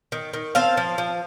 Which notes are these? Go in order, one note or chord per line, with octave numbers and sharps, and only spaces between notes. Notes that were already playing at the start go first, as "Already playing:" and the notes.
D#3
D#3
C4 F5 A5
F3
F3